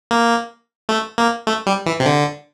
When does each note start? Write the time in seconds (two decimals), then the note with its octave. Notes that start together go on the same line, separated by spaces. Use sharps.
0.11 A#3
0.89 A3
1.18 A#3
1.47 A3
1.67 G3
1.86 E3
2.00 C3
2.06 D3